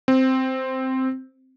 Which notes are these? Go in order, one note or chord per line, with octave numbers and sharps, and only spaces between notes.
C4